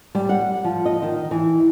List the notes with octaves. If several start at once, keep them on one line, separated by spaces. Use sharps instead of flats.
G3
F#5
F3
D#5
D#3
E3